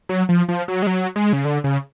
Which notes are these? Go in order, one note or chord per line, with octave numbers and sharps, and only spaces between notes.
F#3
F3
F3
F#3
G#3
F#3
G#3
C#3
D3
C#3